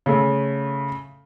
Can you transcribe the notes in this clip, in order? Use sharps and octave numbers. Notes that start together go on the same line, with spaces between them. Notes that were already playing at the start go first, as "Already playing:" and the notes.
C#3 A3